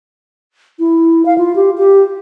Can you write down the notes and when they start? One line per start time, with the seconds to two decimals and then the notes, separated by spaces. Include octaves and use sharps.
0.79 E4
1.26 F5
1.38 F4
1.56 G4
1.78 G4